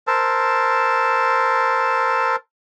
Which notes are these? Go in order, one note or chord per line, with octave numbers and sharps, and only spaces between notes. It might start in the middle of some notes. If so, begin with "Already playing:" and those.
A#4 C5 A5 E6